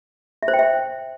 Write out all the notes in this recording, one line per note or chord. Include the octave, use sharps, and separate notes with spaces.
E5
C5
G5
E5